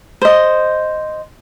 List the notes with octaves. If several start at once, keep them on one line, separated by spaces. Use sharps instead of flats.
C5 D#5